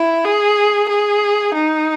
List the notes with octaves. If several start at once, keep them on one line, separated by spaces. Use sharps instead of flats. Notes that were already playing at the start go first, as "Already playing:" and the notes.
Already playing: E4
G#4
G#4
D#4